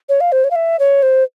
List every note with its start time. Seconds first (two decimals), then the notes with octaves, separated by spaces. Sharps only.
0.09 C#5
0.21 F5
0.32 C5
0.44 C#5
0.51 F5
0.56 E5
0.79 C#5
1.03 C5